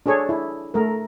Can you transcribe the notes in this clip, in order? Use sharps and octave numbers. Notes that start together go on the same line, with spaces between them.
D4 G#4 A4 C#5
E4
A3 A#4